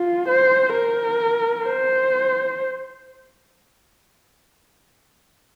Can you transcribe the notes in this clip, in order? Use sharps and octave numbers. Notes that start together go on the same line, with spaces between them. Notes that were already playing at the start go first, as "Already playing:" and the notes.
Already playing: F4
C5
A#4
C5